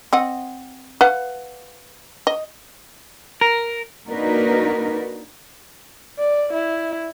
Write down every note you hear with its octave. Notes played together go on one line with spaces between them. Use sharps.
C4 D#5 F#5
B4 F5 F#5
D#5
A#4
A#3 D4 D#4 F#4 A#4 B4
D5
E4